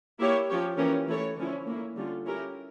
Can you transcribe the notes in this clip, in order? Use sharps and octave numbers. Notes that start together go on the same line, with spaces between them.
A#3 E4 G4 C#5
F3 C#4 G4 C#5
E3 A#3 C#4 G4 A#4
E3 A3 E4 A4 C#5
D3 F3 C#4 E4
A#3 C#4 E4
D3 G3 C#4 F4
C#4 E4 G4 A#4